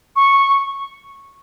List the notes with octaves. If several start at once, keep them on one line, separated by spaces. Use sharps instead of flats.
C#6